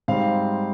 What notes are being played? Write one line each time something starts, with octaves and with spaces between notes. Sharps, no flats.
G#2 G3 C4 F5